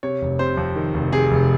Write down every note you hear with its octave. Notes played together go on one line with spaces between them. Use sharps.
C3 C#5
F1
C3 C5
F2
D#3
F1
C3 G#4
F1